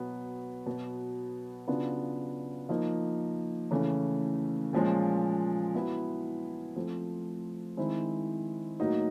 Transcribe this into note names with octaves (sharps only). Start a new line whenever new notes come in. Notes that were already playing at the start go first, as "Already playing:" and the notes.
Already playing: B2 F#3 B3
B2 F#3 B3
C#3 F#3 B3 D4 F4
F3 A#3 D#4
C#3 E3 A3 C#4
A#2 F3 G#3 C#4
F#3 B3 E4
F3 A3 C4
D#3 G#3 C4 E4
A2 F#3 A#3 D#4